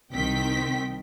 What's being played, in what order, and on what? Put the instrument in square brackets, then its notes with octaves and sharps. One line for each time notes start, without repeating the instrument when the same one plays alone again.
[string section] C2 D#3 C4 G5 B6